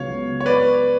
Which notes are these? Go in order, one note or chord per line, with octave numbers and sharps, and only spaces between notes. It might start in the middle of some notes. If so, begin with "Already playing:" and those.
Already playing: C#2 C#3 F#3 B3 C#5 F5
C#5
B4 D5